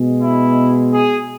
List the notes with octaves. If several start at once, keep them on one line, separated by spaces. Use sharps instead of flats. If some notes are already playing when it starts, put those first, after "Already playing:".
Already playing: B2 G#3
E4
G#4